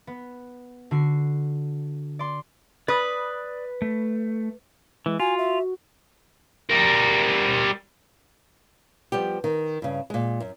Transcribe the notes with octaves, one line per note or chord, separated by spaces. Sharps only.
B3
D3 F#4 C7
D5 C6
B4 D5 D#6
A3
E3 G#3
F4 F#4 G#5
E5
G3 A#4
F3 G3 B3 G4
D#3
G2 C#3
A#2 G#3
F#2